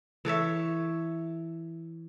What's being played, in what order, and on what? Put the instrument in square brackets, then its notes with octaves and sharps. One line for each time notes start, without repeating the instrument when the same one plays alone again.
[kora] E3 A4 C#5 E5